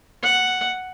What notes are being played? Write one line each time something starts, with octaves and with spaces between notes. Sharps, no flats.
F#5